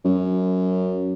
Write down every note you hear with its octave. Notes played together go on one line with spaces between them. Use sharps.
F#2